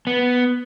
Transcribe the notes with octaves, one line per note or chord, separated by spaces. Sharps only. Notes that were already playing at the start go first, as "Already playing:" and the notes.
B3